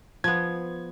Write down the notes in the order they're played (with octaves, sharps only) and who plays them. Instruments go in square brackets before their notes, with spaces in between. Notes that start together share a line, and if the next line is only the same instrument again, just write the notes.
[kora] F3 B3 [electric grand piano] G#6